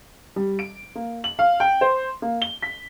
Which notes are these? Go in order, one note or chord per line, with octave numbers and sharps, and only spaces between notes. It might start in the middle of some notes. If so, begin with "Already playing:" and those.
G3
D7
A#3
F#7
F5
G5
C5
A#3
G7
B6